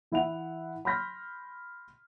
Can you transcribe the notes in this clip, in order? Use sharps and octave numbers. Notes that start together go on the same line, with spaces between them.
E3 E4 E5 F#5 F7
B5 C6 F6 G6 A#6 B6